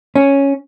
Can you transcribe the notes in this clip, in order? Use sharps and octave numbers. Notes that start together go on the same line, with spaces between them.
C#4